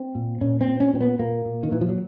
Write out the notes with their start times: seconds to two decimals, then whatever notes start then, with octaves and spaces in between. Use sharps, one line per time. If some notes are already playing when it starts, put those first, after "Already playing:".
Already playing: C4
0.15 A#2
0.41 A#2 C#4
0.61 C4
0.67 A#2
0.80 C#4
0.93 A#2 C4
1.00 B3
1.19 A#2 A#3
1.45 A#2
1.63 D#3
1.71 A#2 E3
1.81 F3
1.89 F#3